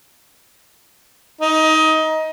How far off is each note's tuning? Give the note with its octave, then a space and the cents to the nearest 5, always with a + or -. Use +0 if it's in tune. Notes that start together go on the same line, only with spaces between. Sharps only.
D#4 +20